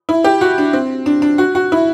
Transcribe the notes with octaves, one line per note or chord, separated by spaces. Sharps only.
E4
G4
F#4
D4
C4
D4
D4
F#4
F#4
E4